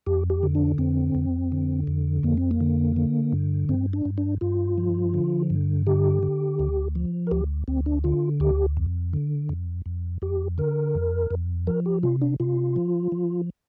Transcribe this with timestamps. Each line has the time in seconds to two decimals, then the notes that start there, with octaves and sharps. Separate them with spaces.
0.07 F2 G4
0.30 G4
0.43 D3
0.55 D4
0.78 F2 C4
1.15 F2
1.52 D3
1.87 F2
2.23 F2 A#3
2.37 C4
2.51 A#3
2.60 D3
2.96 D3
3.32 G2
3.69 G2 C4
3.93 D4
4.05 G2
4.18 D4
4.41 G2 F4
4.78 F3
5.14 D3
5.50 G2
5.87 D3 G4
6.23 D3
6.59 D2
6.95 F3
7.27 A#4
7.31 D2 G4
7.68 D2 C4
7.86 D4
8.04 D3 F4
8.40 D2 G4
8.77 F2
9.13 D3
9.49 F2
9.86 F2
10.22 F2 G4
10.58 D3 A#4
10.95 F2
11.31 F2
11.67 F3 A#4
11.86 G4
12.03 C3 F4
12.22 D4
12.40 C3 F4
12.76 F3
13.12 F3